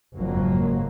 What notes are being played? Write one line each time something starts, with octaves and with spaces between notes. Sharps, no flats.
F#1 F2 G#2 F#3 A#3